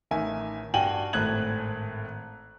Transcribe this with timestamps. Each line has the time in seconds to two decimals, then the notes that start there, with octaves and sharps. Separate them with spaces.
0.11 A1 D#3 E5 G#5
0.74 G2 F#4 G5 G#5 D#7 F#7
1.13 G#1 A2 F#6 G#6 F#7